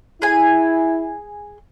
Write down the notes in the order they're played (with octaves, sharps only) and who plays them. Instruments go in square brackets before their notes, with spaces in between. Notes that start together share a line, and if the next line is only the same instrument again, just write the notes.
[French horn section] E4 [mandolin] G#4 G#5